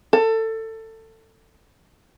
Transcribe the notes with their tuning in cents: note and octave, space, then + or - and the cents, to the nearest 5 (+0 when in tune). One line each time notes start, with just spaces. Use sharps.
A4 +20